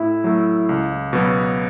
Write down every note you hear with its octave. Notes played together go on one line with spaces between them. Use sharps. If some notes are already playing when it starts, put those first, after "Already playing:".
Already playing: A2 E4
F#3 A3
C#2
B2 F#3 B3